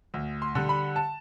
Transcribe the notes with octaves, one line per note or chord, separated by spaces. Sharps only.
D2
C6
D3 G3
B5
A5